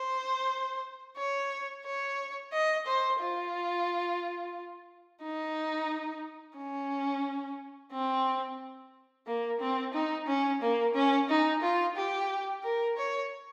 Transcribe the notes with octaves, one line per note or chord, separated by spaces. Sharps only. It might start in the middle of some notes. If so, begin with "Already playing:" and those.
Already playing: C5
C#5
C#5
D#5
C5
F4
D#4
C#4
C4
A#3
C4
D#4
C#4
A#3
C#4
D#4
F4
G4
A#4
C#5